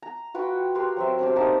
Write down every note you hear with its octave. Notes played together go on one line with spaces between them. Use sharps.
A#5
F4 F#4 B4 G5
G4 A#4 B4 C6
F#3 C4 E5
C4 D4 G4
A#3 D#4 G4 A5